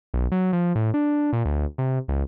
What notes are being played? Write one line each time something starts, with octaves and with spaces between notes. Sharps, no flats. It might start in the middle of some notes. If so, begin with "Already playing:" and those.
B1
F#3
F3
A2
D4
A#2
D2
C3
C#2